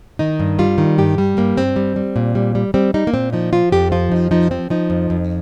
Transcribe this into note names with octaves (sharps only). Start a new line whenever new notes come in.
D#3 D#4
G2
G3 F4
D#3
G2 G4
G3
G2 A#3
G2 C4
G3
G3
A#2
G3
G3
G3 C4
G3 D#4
A#3
A#2 C4
F3 D#4
F3 F4
F2 G4
F3 F4
F2 D#4
F3 D#4
F3 C4
F3 D#4
F2
F2